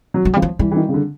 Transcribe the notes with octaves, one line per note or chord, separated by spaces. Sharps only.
F#3
F#3
F3 G3
F#3
E3 G3
E3
D#3
C#3
D3